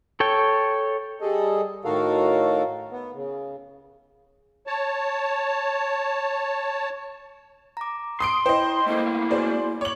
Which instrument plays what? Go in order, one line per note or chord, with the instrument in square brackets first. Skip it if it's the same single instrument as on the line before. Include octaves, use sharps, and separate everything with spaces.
[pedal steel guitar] A4 C#5 G5
[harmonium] G3 G#4 A4 D#5
A2 D#3 F#4 A4 A#4 F5
B3
C#3
[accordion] C#5 A5
[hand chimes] A#5 D6
[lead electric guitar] C6 [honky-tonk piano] D#6 C7 D7
[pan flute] E4 [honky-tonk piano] C5 D#5 [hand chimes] G5
[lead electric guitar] A3 A#3 [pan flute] E4
[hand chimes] F#4 G#4 G#5 [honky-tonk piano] C5 D5
[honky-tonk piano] C#5 F#7 [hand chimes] D6